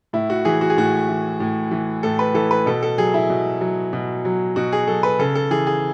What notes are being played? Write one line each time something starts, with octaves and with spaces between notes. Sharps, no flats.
A2 E4
F#4
E3 G#4
F#4
G#4
A2 F#4
E3
A2
E3
A2 A4
B4
E3 A4
B4
B2 A4
A4
F#3 G#4
E4
B2
F#3
B2
F#3
B2 F#4
G#4
F#3 A4
B4
C#3 A4
A4
E3 G#4
G#4